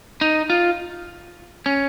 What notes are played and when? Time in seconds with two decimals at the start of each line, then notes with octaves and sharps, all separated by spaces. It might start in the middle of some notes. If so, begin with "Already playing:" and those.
0.21 D#4
0.50 F4
1.66 C#4